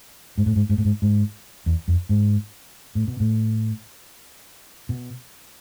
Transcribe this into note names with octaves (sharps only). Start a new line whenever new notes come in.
G#2
A2
G#2
G#2
A2
G#2
G#2
E2
F2
G#2
A2
B2
A2
B2